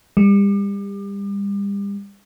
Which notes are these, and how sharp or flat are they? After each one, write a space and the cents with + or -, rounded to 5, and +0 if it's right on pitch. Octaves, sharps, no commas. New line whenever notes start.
G3 +35